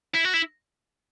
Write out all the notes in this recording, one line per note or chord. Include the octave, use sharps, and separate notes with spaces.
E4
F#4
E4